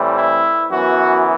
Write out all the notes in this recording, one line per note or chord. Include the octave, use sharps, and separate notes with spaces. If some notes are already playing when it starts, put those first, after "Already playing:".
Already playing: A2 E3 G3 C4
E4
F#2 E3 B3 F#4